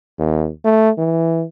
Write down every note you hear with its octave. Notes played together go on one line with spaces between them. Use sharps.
D#2
A3
E3